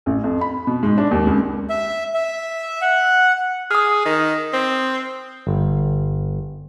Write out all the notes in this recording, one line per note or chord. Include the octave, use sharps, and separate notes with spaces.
A1
F2
B5
B2
G#2
D4
D#2
C#2
E5
E5
F#5
G#4 D#6 F6
D#3
C4
G1